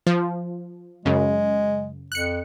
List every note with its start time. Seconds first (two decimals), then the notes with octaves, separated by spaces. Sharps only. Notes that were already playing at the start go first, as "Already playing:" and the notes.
0.07 F3
1.05 F#2 C#3 G#3
2.12 F2 F#6 C#7